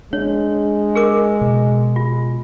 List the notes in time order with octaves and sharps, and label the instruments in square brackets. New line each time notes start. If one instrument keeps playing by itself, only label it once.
[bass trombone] G#3 [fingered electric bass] D4 [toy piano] C#5
[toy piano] G#4 A#4 D6
[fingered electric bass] B2
[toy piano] F4